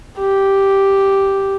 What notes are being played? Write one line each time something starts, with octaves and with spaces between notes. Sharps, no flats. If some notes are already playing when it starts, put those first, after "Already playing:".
G4